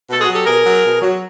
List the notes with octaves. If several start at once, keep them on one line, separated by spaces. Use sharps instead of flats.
B2 A4
F#4 G#4
F#3
G4 A4
B2 G#4 A#4
F#3
B2
F#3